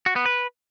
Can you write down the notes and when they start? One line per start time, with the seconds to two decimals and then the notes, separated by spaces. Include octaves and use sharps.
0.06 F#4
0.16 B3
0.26 B4